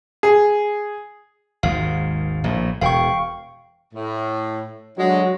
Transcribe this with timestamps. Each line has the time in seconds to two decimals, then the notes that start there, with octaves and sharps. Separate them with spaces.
0.23 G#4
1.63 G#1 D#2 G#2 F5
2.44 A#1 A2
2.81 E1 F5 G5 C#6
3.94 A2
4.98 D3 F#3 G#3 F#4